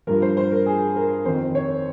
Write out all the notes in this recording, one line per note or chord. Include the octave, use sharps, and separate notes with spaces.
G2 F3 A#4
C5
C5
A#4
G#4
A#4
F2 D#3 C5
C#5